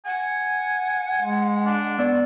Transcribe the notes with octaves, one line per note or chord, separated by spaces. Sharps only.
F#5 G#5
G#3
D4
B3 D5